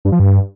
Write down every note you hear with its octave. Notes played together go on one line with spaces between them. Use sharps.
G2
F3
G2